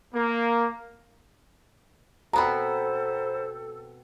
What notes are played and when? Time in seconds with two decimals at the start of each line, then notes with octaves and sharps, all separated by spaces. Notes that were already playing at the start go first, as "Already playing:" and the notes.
0.14 A#3
2.33 B2 B3 C4 A4 C5 A#5 B5